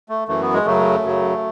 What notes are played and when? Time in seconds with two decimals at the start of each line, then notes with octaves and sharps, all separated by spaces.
0.09 A3
0.28 F#2 E3 A3
0.41 B3
0.53 G#3
0.65 F#2 C#3 F#3 A3
1.03 F#2 C#3 F#3